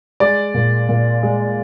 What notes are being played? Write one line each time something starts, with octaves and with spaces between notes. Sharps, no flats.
G#3 D5
A#2
A#2
G#3